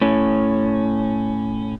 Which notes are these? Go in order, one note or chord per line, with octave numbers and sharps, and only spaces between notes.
A2 C#4